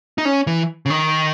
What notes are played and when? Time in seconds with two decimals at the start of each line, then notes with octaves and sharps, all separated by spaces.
0.18 D#4
0.25 C#4
0.47 E3
0.86 C#3
0.90 D#3